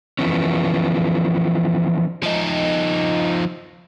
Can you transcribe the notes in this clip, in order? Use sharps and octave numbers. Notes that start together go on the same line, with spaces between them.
E3 F3 B3 C#4
F3 D#4